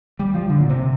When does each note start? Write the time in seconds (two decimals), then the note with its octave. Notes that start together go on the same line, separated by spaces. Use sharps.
0.19 G3
0.34 F3
0.50 D3
0.60 A#2
0.70 C3